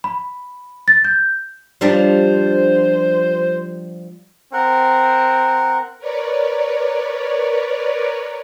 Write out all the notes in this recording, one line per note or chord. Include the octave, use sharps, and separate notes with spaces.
B5
A6
G6
F3 G3 D4
C5
C4 A#4 F#5
A#4 B4 C#5 D5